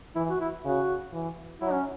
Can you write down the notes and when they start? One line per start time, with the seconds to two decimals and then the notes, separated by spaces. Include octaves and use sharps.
0.16 E3 E4
0.29 F#4
0.41 E4
0.65 C#3 F#4
1.13 E3
1.61 F#3 E4
1.72 C#4